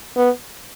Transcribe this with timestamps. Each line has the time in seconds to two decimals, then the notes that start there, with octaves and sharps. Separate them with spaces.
0.16 B3